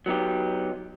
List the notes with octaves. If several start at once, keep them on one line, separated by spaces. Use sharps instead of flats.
F#3 B3 D#4 G4